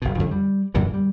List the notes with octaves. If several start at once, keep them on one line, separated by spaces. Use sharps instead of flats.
F#1 B2
F2 D3 E3
G3
F#2 A#2 D3 E3
G3